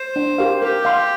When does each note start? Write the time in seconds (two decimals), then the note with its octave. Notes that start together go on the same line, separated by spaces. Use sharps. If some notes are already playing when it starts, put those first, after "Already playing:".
Already playing: C5
0.16 D4
0.38 G4 A#4 F5
0.62 G4 A#4
0.85 F5 C6